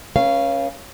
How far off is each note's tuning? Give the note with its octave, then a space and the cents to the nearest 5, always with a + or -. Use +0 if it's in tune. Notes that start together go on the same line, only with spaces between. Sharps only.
C#4 -5 B4 -40 F5 -20